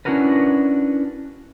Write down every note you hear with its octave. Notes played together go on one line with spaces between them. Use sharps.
C#4 D4 E4 F#4 A#4 B4